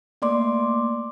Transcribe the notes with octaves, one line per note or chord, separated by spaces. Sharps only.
A3 A#3 D5 C6 D6